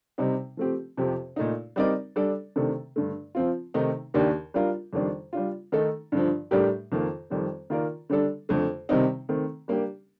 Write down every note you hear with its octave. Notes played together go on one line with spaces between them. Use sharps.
C3 G3 C4 D#4
F3 A3 C4 G4
F2 C3 F3 C4 G4
A#2 A3 D#4
G3 C4 D#4 A#4 D5
G3 D4 A4 D5
C3 D#3 A3 D4 A4
G2 D3 A3
F3 C4 F4
C3 D#3 A3 D#4
D#2 D#3 A#3 D4 G4
G3 D4 F4 A#4
F2 D#3 G3 D4
G3 D4 F4
D#3 A3 D#4 A4
G2 D3 F3
A2 G3 D4 G4 A#4
F2 D#3 A#3
F2 D#3 G3 C4
D#3 A#3 F4 A#4 D5
D3 G3 D4 A4
F2 D3 A3
C3 D#3 G3 C4 D#4
D#3 A3 C4
G3 A#3 D4 G4